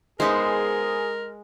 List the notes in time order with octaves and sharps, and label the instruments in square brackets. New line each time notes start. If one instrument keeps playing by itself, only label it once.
[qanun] G#3 [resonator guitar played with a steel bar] B3 D#4 C5 [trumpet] G#4 [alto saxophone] A#4